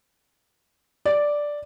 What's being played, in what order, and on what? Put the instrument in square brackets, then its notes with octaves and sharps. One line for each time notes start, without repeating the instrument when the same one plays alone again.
[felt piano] D5